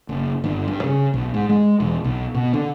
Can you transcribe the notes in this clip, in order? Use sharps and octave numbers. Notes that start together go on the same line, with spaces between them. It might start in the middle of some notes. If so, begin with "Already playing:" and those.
F#1
G1
G2
C#3
B1
G#2
G#3
E1
B1
B2
D3